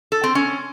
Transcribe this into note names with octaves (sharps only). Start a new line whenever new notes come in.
A4
C4
C#4